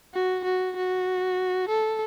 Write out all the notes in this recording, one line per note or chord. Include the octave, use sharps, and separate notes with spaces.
F#4
F#4
F#4
A4